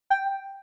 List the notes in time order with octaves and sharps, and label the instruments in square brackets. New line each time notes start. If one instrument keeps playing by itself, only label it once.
[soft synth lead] G5